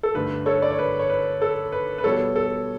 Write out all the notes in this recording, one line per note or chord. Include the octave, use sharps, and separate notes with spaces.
A4
G2 D3 A3 B4
A4 C#5
D5
C#5
B4
C#5
B4
A4
B4
B4
B2 G3 B3 A4 C#5
A4